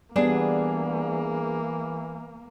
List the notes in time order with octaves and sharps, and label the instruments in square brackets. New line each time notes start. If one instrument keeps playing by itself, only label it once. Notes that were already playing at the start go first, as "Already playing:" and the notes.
[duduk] E3 [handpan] G3 B3 [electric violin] A#3 [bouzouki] D4 G#4 B4